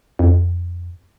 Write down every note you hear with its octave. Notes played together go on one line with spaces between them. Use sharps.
F2